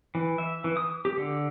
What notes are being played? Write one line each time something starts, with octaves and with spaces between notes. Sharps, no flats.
E3
E5
E3
D#6
G4
D3